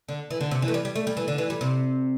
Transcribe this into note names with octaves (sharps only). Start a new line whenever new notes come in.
D3
E3
D3
C3
E3
A3
G3
G3
A3
G3
E3
D3
E3
G3
C3